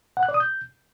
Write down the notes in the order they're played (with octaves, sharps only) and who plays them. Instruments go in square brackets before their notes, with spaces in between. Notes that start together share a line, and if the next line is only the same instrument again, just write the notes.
[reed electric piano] F#5
F#6
D5
D#6
G6